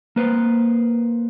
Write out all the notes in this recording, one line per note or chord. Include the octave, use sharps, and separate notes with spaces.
A#3 B4 C5